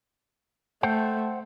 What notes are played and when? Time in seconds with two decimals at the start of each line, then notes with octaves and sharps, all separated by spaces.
0.83 A3 C5 F#5 G5